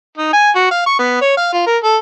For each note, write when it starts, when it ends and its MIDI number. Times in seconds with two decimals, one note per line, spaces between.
0.17 0.31 63
0.33 0.50 80
0.55 0.70 66
0.71 0.83 77
0.86 0.97 85
0.99 1.18 59
1.21 1.33 73
1.37 1.49 77
1.53 1.62 65
1.67 1.77 70
1.83 1.96 69